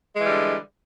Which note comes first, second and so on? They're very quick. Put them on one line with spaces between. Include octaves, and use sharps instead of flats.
G#3 E3 G3 D3